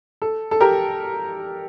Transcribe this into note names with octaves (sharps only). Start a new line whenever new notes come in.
A4
A4
G4 A#4